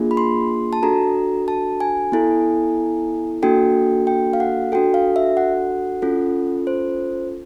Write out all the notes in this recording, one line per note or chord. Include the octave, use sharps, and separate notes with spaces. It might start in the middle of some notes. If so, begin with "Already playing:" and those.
Already playing: A#3 D4 F4 G#4
B5
C6
A5
D4 F#4 A4 A#5
A5
G#5
B3 E4 A4
A#3 D4 F#4 A4 G5
G5
F5
F#5
D4 F#4 A4 G5
F5
E5
F#5
C#4 F4 A4
C5